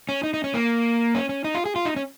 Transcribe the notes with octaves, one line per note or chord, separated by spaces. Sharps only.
C#4
D#4
D#4
C#4
A#3
C#4
C#4
D#4
F4
G#4
F4
D#4
C#4